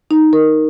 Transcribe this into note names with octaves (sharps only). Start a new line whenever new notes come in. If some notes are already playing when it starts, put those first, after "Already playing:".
D#4
A#4